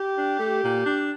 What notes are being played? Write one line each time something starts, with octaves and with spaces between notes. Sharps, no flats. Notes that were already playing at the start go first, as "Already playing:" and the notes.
Already playing: G4
D4
A3
A#2
D4